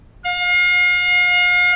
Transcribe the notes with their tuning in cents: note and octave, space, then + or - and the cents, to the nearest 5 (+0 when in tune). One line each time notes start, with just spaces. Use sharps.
F5 +40